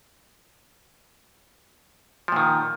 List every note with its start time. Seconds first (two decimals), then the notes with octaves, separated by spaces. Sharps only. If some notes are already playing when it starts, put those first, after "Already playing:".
2.28 F3
2.32 A#2
2.36 D#3